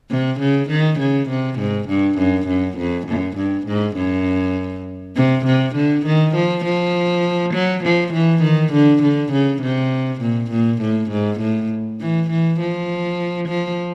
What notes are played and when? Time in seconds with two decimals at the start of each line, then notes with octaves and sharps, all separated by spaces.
0.10 C3
0.40 C#3
0.70 D#3
0.99 C#3
1.29 C3
1.59 G#2
1.88 G2
2.19 F#2
2.48 F#2
2.77 F2
3.07 F#2
3.37 G2
3.67 G#2
3.96 F#2
5.16 C3
5.46 C3
5.75 D3
6.05 D#3
6.35 F3
6.65 F3
7.54 F#3
7.84 F3
8.13 E3
8.42 D#3
8.73 D3
9.03 D3
9.32 C#3
9.62 C3
10.21 A#2
10.51 A#2
10.81 A2
11.10 G#2
11.40 A2
12.00 E3
12.30 E3
12.60 F3
13.48 F3